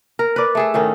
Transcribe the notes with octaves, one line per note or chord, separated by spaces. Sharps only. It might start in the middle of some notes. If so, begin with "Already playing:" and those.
A#4
B4 D5
A3 G#4 A4
A2 D#3 C#4 D#4